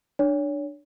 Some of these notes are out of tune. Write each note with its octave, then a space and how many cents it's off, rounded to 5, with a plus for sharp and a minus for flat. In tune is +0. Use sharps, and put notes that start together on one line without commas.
D4 +15 C#5 +30